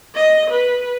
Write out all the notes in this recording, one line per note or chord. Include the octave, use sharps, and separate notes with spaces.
D#5
B4